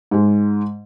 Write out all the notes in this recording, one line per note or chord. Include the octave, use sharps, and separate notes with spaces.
G#2 G#3